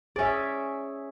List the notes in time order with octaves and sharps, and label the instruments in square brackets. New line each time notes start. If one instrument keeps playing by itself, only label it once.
[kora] C#4 D5 [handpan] G#4 C#5 E5